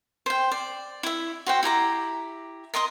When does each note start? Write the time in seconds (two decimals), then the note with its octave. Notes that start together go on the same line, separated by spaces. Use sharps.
0.26 C5 G5
0.51 D5
1.03 E4 E5
1.46 F#4 C5 G5
1.63 E4 G4 A#5 D6
2.74 A#4 D#5 C6 D#6